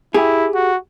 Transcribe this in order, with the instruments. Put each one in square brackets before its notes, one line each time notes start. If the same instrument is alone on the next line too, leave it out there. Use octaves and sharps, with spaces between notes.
[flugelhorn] E4 [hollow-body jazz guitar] G4 G#4
[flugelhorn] F#4